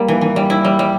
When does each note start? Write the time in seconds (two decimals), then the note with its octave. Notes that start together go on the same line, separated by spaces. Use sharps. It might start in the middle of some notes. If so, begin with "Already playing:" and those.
Already playing: G3 A#3
0.08 E3
0.21 E3
0.36 G3
0.50 E4
0.64 G3
0.79 G3